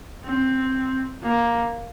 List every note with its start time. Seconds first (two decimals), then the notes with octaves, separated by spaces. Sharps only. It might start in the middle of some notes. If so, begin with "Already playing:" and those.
0.24 C4
1.23 A#3